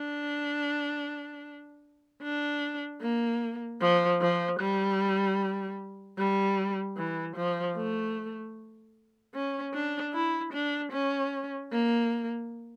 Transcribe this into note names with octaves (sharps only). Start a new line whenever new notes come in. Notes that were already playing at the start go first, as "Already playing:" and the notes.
Already playing: D4
D4
A#3
F3
F3
G3
G3
E3
F3
A3
C#4
D4
E4
D4
C#4
A#3